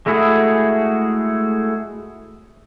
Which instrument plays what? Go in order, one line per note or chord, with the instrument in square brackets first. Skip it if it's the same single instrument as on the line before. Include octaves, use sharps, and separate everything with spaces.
[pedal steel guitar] G#3 A3 E4 F#4 G#4